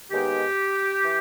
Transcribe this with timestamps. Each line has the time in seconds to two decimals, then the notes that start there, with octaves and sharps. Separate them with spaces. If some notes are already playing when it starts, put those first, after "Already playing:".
0.11 D#2 D#3 G#3 B3 G4
1.04 E3